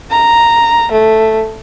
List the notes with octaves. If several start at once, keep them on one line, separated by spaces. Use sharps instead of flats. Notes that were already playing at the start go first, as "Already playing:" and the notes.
A#5
A3